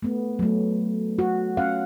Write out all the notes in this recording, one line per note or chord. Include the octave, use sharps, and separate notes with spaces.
A3 B3
F#3 A3
F#4
C#4 F5 F#5